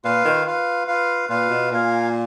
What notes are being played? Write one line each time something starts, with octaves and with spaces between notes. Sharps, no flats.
A#2 F4 B4 F5
D#3
F4 B4 F5
F4 B4 F5
A#2 F4 B4 F5
B2
A#2 F4 A#4 F5 G#5